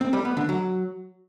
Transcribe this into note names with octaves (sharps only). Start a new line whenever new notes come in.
C4
G3
B3
D3
F#3